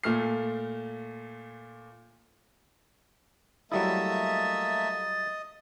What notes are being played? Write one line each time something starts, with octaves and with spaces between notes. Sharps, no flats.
A#2 A3 F6 C7
F#3 G3 A3 A#3 E4 D#5 E5 A6